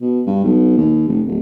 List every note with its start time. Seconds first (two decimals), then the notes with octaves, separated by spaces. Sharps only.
0.01 B2
0.26 G2
0.44 B1
0.77 D#2
1.07 F1
1.26 D1